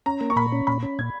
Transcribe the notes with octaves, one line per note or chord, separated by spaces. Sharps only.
C#4 A#5
A#3
C#6
A#2 B5
C#4
A#2 B5
C#4
A#2 G#6